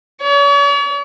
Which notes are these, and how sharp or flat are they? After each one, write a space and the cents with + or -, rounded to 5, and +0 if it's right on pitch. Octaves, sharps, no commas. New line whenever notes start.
C#5 +45